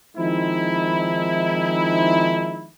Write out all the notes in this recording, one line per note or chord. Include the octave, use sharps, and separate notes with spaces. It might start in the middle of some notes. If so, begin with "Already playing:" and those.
D#3 F3 G#3 C4 D#4 E4